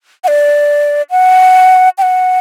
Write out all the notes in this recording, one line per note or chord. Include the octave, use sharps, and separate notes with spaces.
F#5
D5
F#5
G5
F#5